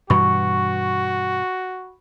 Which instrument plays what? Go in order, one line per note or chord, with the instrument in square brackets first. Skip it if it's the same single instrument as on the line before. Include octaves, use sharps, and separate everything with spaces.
[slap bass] G2 B2 E3 [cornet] F#4 [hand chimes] B5 C#6